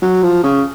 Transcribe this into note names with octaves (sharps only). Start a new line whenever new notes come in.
F#3
F3
C#3